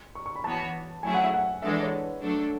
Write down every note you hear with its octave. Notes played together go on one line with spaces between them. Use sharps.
C#6
C#6
B5
E3 B3 F#4 C#5 A5
F#3 A3 C#4 E4 G#4 G#5
F#5
E5
F#5
E3 G#3 D4 A4 E5
D5
C#5
B4
F#3 A3 D4 A4